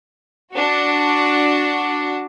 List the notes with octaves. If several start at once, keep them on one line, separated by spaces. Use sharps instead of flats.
D4 F#4